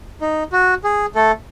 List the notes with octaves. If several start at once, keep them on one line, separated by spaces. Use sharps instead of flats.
D#4
F#4
G#4
A3 A4